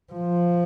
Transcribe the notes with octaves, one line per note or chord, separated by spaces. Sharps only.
F3